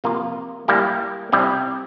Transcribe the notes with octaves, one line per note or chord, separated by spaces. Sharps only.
C3 F3 A#3 F4
G3 A#3 E4 G4
C3 G3 C4 E4 G4